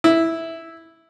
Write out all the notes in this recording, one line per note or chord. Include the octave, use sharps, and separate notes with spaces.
E4